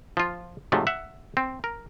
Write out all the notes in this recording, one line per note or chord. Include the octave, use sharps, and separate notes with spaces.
F3 F4
G#2 C3 F3 F#3 A3
E5 F#5
C4
A#4